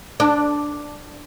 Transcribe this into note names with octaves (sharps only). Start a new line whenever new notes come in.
D4